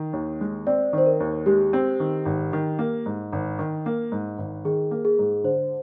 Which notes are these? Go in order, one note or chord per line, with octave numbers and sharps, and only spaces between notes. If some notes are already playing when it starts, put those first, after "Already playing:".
Already playing: D#3
D#2
G#3
C4 D5
D#3 C5
A#4
D#2
G#3 G4
C4
D#3
G#1
D#3
A#3
G#2
G#1
D#3
A#3
G#2
G#1
D#3 G#4
A#3
G#4
G#2
D3 C5